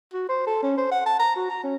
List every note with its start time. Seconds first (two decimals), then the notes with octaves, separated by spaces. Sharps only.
0.14 F#4
0.29 C5
0.47 A4
0.63 C#4
0.77 C5
0.91 F#5
1.06 A5
1.20 A#5
1.36 F#4
1.50 A#5
1.64 C#4